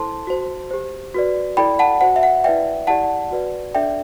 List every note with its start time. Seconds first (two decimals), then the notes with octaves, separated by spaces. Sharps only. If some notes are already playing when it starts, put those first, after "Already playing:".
Already playing: E4 A4 C5 A5 C6
0.27 F#4 C5
0.71 G4 C5
1.14 F#4 B4 D5
1.57 E4 A4 D5 G5 B5
1.79 F#5 A5
2.01 F#4 C5 F#5
2.16 E5
2.23 F#5
2.44 E4 B4 D5 E5 G5
2.87 E4 G4 D5 F#5 A5
3.31 F#4 B4 D5
3.75 D4 A4 D5 E5 G5